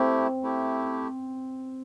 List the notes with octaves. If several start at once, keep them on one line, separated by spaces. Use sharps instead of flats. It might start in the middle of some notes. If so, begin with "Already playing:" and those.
Already playing: A3 C4 E4 G4
A3 E4 G4